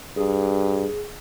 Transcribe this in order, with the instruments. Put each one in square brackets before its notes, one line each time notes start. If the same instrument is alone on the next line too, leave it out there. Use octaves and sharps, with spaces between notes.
[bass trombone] G2 [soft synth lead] G#4